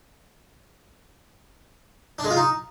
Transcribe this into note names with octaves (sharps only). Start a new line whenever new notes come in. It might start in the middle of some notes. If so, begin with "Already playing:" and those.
D4
G#3
F4
D#4